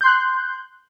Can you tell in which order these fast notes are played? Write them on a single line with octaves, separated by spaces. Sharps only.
G6 C6 F#6